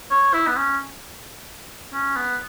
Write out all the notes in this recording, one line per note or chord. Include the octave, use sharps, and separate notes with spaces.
C#5
E4
B3
C#4
C#4
B3